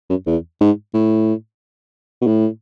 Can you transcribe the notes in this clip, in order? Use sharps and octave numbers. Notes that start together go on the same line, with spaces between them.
F#2
E2
G#2
A2
B2
A2